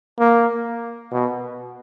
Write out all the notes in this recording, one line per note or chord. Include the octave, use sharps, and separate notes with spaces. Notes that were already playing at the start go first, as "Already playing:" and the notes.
A#3
B2